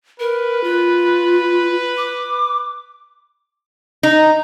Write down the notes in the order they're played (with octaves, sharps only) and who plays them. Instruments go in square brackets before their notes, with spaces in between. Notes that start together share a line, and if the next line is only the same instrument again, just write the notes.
[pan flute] A#4 [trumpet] B4
[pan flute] F4
D6
[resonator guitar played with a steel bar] D#4